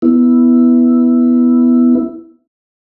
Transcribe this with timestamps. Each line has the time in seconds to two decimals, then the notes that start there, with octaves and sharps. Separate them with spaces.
0.02 B3 E4